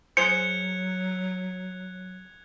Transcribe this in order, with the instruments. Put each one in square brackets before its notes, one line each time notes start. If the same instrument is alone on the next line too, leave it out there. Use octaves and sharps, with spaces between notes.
[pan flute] F#3 [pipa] G#4 C5 [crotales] F#6 G#6 F7 [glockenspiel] C#7